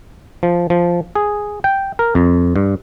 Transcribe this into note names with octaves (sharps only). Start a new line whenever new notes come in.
F3
F3
G#4
G5
A#4
F2
G2